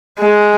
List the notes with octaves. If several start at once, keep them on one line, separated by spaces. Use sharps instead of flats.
G#3